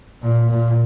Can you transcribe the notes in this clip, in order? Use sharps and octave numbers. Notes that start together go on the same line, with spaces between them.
A#2
A#2